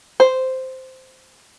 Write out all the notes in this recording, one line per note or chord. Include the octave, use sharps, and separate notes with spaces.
C5